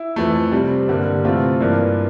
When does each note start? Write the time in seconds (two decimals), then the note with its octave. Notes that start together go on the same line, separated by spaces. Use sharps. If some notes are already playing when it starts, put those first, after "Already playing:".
Already playing: E4
0.16 F2 E3 A3
0.52 C3 G3 C4
0.88 G2 D3 G3 A#3
1.24 C3 E3 A3 C4 F4
1.60 G2 E3 A#3 D4